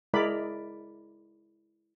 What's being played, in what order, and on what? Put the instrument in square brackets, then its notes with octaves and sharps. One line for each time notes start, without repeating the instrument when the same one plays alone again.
[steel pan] G#3 E4 A#4 D5 B5